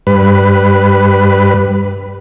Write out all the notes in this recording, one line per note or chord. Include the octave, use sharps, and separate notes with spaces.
G2 B4